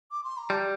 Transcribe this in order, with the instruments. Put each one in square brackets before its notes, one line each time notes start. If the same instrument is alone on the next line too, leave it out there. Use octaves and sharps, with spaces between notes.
[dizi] D6
C6
A#5
[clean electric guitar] G3 [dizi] A5